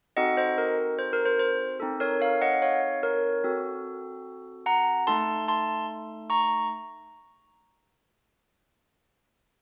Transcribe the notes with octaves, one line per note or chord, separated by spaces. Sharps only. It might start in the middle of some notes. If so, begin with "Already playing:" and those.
C4 D#4 F#4 A4 D#5 F#5
C5 D#5
A#4
C5
A#4
C5
C5
C4 D#4 A4
A#4 C#5
C#5 F5
D#5 F#5
C#5 F5
A#4 C#5
C4 F#4 A4
F#5 A#5
A3 D#4 A4 A5 C6
A5 C6
A#5 C#6